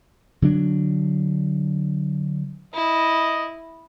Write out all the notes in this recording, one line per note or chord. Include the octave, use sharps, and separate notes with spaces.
D3 F#3 D4
E4 D#5